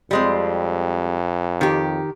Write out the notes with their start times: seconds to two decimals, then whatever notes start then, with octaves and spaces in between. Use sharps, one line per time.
0.11 F2 G3 G#3 C4
1.61 D#3 G4